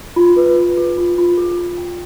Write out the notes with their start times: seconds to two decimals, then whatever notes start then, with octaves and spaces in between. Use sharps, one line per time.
0.16 F4
0.36 B4
0.56 F4
0.77 G#4
0.98 F4
1.18 F4
1.37 G#4
1.58 G#4
1.78 G5